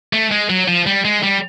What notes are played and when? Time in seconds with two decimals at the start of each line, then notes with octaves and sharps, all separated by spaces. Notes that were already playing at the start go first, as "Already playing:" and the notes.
0.13 A3
0.32 G#3
0.50 F#3
0.68 F3
0.87 G3
1.05 G#3
1.23 G3